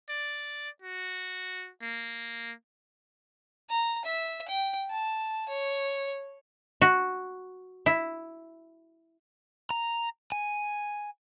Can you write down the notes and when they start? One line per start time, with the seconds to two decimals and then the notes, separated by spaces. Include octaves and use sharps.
0.11 D5
0.82 F#4
1.83 A#3
3.70 A#5
4.05 E5
4.49 G5
4.90 A5
5.49 C#5
6.81 F#4
7.86 E4
9.71 A#5
10.32 G#5